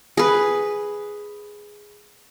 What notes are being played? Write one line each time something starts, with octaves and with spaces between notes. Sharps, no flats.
G#4 B4